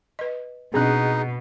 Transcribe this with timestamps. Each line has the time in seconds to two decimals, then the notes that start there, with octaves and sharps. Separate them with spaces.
0.19 B4 D#5
0.74 B2 C4 D4 D#4 G#4 D#5 F#6